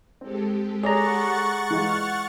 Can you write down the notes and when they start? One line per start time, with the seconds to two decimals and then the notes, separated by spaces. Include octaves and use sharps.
0.21 G#3 C4 G4 A4
0.83 G#4 C#5 D5 F#5 A#5 C#6 A6
1.70 E3 G#3 F4 F6